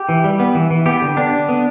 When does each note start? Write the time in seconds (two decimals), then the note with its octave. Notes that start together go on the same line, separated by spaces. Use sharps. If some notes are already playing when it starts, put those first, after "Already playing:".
Already playing: G4
0.09 E3
0.24 G3
0.39 B3
0.55 E3
0.70 E3
0.86 B3 G4
1.01 D3
1.17 B3 D4
1.32 D3
1.49 B3